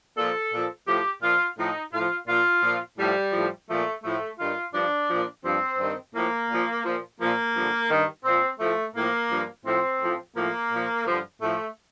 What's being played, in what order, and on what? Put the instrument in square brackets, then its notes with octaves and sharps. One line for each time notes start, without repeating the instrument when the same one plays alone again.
[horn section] A#2 F3 A4
A#2 F3
A2 F3 G4
A#2 F3 F4
A2 F3 D#4
A2 F3 F4
A#2 F3 F4
A#2 F3
A2 F3 G3
A2 F3
A#2 F3 A3
A2 F3 A3
G2 D#3 F4
G2 F3 D4
A#2 F3
G2 F3 C4
G2 D#3
A2 F3 A#3
A#2 F3
A#2 F3
A#2 F3 A#3
G2 D3 F3
G2 D#3
A#2 F3 C4
A2 F3 A3
A2 F3 A#3
G2 F3
A2 F3 C4
A2 F3
A2 F3 A#3
A#2 F3
G2 D3 F3
A2 F3 A3